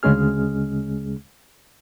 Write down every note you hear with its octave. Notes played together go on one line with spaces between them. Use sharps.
D2 C#3 G#3 C#4 G#4 F6